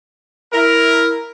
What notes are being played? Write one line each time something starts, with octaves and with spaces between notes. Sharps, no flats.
E4 A#4